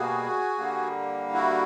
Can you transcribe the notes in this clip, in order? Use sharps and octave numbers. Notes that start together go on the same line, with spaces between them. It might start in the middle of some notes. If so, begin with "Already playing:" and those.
Already playing: B2 G3 A#3 F#4 G#4
D3 G3 A#3
E4 F#4